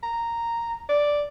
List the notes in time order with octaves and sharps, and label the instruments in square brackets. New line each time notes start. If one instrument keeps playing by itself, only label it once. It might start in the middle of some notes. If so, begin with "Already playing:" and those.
[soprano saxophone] A#5
D5